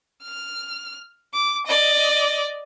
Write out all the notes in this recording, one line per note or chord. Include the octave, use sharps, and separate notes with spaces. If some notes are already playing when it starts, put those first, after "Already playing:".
F6
D6
D5 D#5